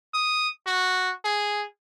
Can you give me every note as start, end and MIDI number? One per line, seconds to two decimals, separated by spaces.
0.14 0.49 87
0.67 1.11 66
1.25 1.65 68